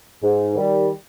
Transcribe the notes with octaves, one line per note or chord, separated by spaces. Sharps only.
G#2
D#3 G3